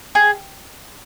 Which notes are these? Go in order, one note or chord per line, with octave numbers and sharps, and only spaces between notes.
G#4